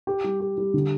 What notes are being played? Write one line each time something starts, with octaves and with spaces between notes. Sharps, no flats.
G4
G3
G4
G3
D3